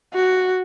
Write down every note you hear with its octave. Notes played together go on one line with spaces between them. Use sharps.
F#4